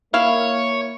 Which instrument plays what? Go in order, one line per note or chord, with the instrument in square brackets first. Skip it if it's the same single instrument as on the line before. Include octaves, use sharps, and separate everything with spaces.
[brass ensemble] A#3 [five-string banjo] E4 F5 [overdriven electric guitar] C#5